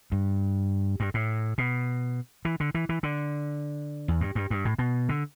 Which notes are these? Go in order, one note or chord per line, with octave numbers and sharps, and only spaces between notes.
G2
G2
A2
B2
E3
D3
E3
E3
D3
E2
G2
G2
G2
A2
B2
D3